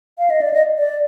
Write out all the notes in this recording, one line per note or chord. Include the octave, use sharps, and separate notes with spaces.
F5
D#5
D5
D#5
D5